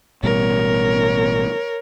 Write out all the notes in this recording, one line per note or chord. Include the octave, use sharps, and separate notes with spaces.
A1 B2 G3 A#4 C#5